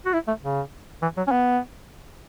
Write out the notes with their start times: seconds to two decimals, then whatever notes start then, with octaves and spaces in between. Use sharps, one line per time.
0.06 F#4
0.13 E4
0.28 A3
0.43 C#3
1.02 E3
1.17 F#3
1.27 C#4
1.32 B3